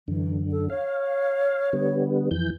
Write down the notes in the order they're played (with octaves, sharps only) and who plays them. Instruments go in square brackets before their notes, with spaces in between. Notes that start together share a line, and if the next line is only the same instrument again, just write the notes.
[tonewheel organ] F#2 D3 [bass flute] E3
[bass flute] A4
[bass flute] C#5 [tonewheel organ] F5
[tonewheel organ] D3 G3 B3
F2 E3 G6